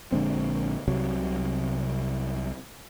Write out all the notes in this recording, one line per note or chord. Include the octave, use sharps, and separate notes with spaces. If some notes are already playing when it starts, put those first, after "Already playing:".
A#1 D3 G#3 C4
C2 C3 F#3